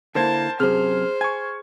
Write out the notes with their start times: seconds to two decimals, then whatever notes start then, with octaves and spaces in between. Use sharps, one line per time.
0.15 D3 A#3 E4 A#4 C5 A5 G#6
0.60 F#2 C3 G#4 C5 F6
1.21 G#5 C#6 G#6